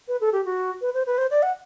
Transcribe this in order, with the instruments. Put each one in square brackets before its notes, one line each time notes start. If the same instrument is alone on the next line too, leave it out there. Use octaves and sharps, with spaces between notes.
[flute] B4
A4
G4
F#4
B4
C5
B4
C5
D5
F#5